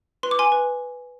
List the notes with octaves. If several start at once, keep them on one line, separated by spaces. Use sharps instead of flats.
B4 C6
D6
G#5 C6
B4